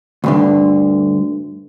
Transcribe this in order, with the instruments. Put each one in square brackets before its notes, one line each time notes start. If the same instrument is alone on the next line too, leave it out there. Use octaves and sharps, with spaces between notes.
[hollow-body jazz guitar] D2 G2 D3